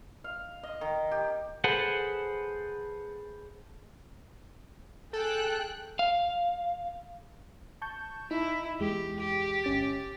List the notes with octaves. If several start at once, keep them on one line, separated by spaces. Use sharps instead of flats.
F5
D#5
D#3
G4
G#4 A4 B4 C5 F#5
G#4 A4 G5 F#6
F5
A5 C#6 G6
D#4 E4
E2 G#3 G4
G4
G1 C#4 A6